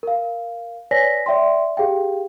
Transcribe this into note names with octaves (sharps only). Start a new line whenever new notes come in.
A#4 F5
B4 C#5 D5 G#5 A#6 B6
D5 E5 G5 C6
G4 G#4 F5 G5